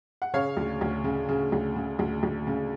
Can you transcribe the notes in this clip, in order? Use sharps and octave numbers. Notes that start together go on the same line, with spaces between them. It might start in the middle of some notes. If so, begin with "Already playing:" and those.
F#5
C#3 C#5 F5
D2
D2
C#3
C#3
D2
C#3
D2
D2
C#3